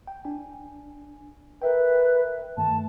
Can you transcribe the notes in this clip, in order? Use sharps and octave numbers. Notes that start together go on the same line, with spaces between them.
G5
D4 G#5
A#4 B4 E5 G5
G2 D#3 A3 A5